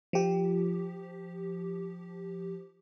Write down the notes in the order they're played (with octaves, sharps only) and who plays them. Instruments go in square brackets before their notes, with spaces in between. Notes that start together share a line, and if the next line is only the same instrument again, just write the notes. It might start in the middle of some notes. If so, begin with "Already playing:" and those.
[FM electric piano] F3 G4